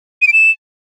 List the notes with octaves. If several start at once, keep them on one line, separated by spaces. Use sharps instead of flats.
D#7
D7
E7